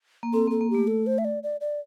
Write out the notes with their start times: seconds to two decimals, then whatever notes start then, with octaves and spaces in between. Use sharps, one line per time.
0.23 A#3
0.33 C4 A4
0.47 A#3 A4
0.61 A#3
0.70 A3 G4
0.87 A4
1.07 C5
1.18 E5
1.25 D5
1.43 D5
1.61 D5